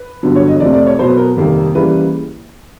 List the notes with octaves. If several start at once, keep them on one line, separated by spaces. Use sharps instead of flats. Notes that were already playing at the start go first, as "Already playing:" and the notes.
Already playing: B4
G2 D3 F#3 B3
C#5
D#5
F2 C3 F3 A3 C4 D5
D5
C#5
B2 F#3 B3 C5
B4
A#4
F2 C3 D#3 G3 A#3
C#3 E3 G3 A#3 B4